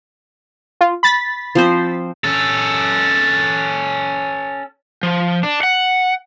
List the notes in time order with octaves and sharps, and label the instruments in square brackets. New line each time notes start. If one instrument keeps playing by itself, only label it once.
[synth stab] F4
B5 A6 B6
[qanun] F3 C4 C5
[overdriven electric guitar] C#4 A4
[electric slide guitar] F3
D4
F#5